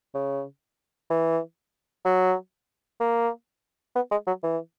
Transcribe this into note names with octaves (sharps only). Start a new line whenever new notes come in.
C#3
E3
F#3
A#3
B3
G#3
F#3
E3